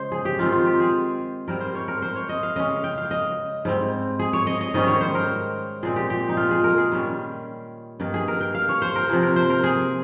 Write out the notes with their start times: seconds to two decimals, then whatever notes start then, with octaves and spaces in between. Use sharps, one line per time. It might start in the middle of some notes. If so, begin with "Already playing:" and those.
Already playing: C#3 G#3 C5
0.12 G#4
0.25 G4
0.38 D#3 G#3 C4 D#4 F4
0.52 F4
0.66 G4
0.80 G#4
1.48 G#2 G3 C4 A#4
1.61 C5
1.75 C#5
1.88 A#4
2.02 C5
2.15 C#5
2.29 D#5
2.43 F5
2.56 C#3 G#3 C#4 D#5
2.70 F5
2.84 G5
2.98 F5
3.11 D#5
3.65 G#2 G3 C4
4.19 G#4
4.33 C#5
4.47 D#5
4.61 D#5
4.74 G#2 D#3 G3 C#4 D#5
4.87 C#5
5.01 C5
5.15 A#4
5.83 A#2 G#3 C4 G#4
5.96 G4
6.10 G4
6.29 D#4
6.37 F4
6.51 G#4
6.64 A#4
6.78 G#4
6.92 D#3 G3 C#4
8.00 G2 D#3 A#3 D#4
8.14 G#4
8.28 A#4
8.41 G5
8.54 F5
8.69 C#5
8.82 C5
8.95 A#4
9.09 C3 F3 A#3 G#4
9.23 A#4
9.36 C5
9.50 A#4
9.64 G#4